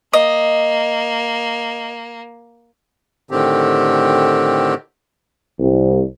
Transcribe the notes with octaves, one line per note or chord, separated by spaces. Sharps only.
A#3 D#5
A2 D3 D#3 C4 G4
C2